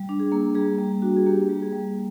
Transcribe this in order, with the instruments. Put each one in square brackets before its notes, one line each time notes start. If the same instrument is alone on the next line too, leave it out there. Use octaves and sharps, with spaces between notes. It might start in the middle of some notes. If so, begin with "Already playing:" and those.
Already playing: [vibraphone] G3
D4
G#4
A#3
G3 G#4
G3
D4 F#4
G#4
A#3 G4
G3
G#4
G3